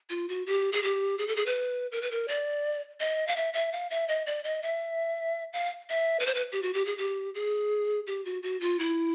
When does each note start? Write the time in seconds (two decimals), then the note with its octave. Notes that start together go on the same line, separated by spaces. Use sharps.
0.10 F4
0.29 F#4
0.46 G4
0.72 G#4
0.83 G4
1.18 G#4
1.27 A4
1.36 G#4
1.46 B4
1.92 A#4
2.02 B4
2.11 A#4
2.28 D5
3.00 D#5
3.27 F5
3.36 E5
3.53 E5
3.72 F5
3.90 E5
4.08 D#5
4.26 D5
4.44 D#5
4.63 E5
5.53 F5
5.90 E5
6.20 B4
6.26 C5
6.35 B4
6.52 G4
6.62 F#4
6.74 G4
6.85 G#4
6.98 G4
7.34 G#4
8.07 G4
8.25 F#4
8.43 F#4
8.61 F4
8.79 E4